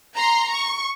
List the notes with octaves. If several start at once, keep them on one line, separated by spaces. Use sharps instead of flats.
A#5 C6
C#6